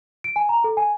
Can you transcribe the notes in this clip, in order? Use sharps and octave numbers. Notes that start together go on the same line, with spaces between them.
D7
G#5
A#5
A4
G#5